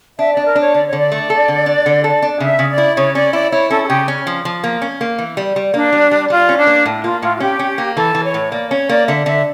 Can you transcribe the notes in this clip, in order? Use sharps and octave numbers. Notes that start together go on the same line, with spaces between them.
D4 E5
D4 D5
A#4
D4 C#5
D3 D5
C#5
D3 D5
A3
A4
D3
D4
D3
A4
D4
C#3 E5
C#3
D5
E4
C#3 C#5
C#4 D5
E4 D5
E4 C#5
C#4 A4
A4
C#3 G4
C#4
F3
F3
A#3
C#4
A#3
E3
G3
G3
A#3 D4
G3
G3
G3 F4
C#4
D4
A#3
A2
A#3 F4
A2 F4
F4
C#4 G4
C#4
A#3
E3 A4
E3
C#5
A2
A#3 D5
C#4 C#5
A#3 D5
D3 E5
D3 E5